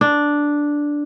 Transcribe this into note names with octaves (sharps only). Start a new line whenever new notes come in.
D4